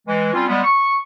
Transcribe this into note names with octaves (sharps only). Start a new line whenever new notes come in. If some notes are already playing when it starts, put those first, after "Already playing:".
E3 G#3
G3 C4 C#4 F4
G3 G#3 B3
C#6